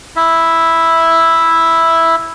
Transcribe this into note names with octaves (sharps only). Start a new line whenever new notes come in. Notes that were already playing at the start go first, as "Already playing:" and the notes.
E4 E5